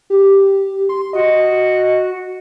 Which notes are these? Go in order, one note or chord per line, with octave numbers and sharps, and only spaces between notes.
G4
C6
F#4 D#5